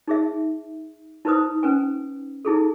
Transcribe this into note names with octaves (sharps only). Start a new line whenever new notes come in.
D#4 G#4 E5
D#4 E4 B4 C5 D#6
C#4 B4 G#5
D#4 E4 G#4 A4